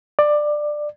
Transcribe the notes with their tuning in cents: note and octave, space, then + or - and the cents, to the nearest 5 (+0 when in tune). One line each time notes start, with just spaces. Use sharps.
D5 +15